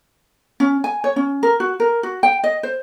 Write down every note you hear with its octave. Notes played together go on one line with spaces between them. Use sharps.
C#4
G#5
C#5
C#4
A#4
F#4
A#4
F#4
G5
D#5
C5